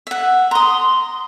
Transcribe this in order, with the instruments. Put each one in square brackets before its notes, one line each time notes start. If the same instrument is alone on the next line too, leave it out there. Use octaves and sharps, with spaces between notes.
[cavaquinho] E5 F#5
[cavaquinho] A#5 D#6 [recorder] C6